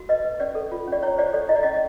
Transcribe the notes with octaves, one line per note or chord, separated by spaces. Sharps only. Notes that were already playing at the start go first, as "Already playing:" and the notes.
Already playing: F#4
B4 D#5
B4
C#4 D5
A4
F4
C#4
D5
E4 C#5
C5 D5
A4 D5
E4 D#5
D5
C#4 D#5